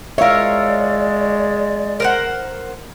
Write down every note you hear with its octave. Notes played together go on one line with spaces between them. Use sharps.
G#3 A#4 C#5 D5 E5 F5
A#4 C5 F#5